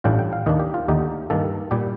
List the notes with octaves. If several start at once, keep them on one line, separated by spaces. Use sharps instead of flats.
A1 A2 G3 D4 F4 G5
G5
F5
D#2 D#3 A#3 D4 D#5
G4
F4
D#2 D3 A3 D#4 G4
G2 D#3 A#3 A4
A#2 G3 G4